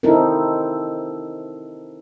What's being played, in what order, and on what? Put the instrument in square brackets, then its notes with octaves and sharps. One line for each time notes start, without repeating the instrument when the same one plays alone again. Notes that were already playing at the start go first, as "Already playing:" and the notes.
[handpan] C4 D#4 E4 A4 A#4